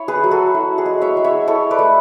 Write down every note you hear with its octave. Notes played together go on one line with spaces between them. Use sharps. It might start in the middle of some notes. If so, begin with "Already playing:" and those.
Already playing: E4 C#5
G#4 B4
F#3
F#4 A4
E4
G#4
G#3
C#5 E5
G#3
C#5 E5
E4 A4 C#5
B4 D5
A3